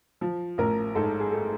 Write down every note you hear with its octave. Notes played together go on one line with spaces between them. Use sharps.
F3
A1 A#4
G#2 A4
G#4
A3